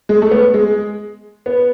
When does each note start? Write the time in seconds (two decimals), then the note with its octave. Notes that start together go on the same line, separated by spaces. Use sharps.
0.09 G#3
0.22 A3
0.31 B3
0.54 G#3
1.46 B3